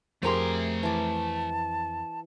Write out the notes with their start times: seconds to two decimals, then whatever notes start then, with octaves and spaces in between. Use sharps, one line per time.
0.23 F2 A3 G4 G#4 A#4 C5 A#5 C6
0.83 E3 A5 D6